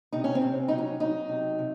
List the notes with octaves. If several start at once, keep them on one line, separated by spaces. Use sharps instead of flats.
C3 D#4
C#4
C4
C3
F#3 D#4
C#4
F#3 D#4
C3
C3